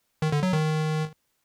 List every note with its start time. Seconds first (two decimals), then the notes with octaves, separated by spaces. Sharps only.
0.22 D#3
0.32 D3
0.43 F#3
0.53 D#3